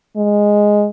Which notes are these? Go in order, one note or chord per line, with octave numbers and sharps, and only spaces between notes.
G#3